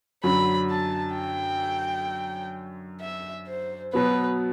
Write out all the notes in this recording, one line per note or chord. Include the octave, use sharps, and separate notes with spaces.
F#2 D3 F#3 B5
A5
G5
E5
C5
B2 F#3 B3 B4